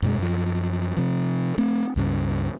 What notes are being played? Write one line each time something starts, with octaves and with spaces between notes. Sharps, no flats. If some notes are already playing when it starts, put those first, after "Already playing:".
F#2 B2 G#3
F#2 F3
C3 F3
A3 C4
C#2 G2 C#3